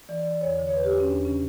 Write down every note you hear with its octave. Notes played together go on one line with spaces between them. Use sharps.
E3 D5
D5
E3
D5
E2 C#5
D3
C#5
E2 B4
G4
E2 F#4
C#4
E2 D4
C#3 C#4